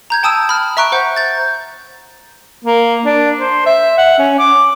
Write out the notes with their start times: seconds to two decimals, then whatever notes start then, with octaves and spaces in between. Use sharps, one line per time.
0.10 A#5 G6 G#6
0.23 G5 A5 D#6 E6 D#7 E7
0.49 B5 F6
0.77 E5 A#5 C#6 F#6 D7
0.92 C5 F#5 G6
1.16 G6 A6
2.65 A#3
3.06 D4
3.39 C5
3.66 E5
3.98 F#5
4.19 C#4
4.39 D6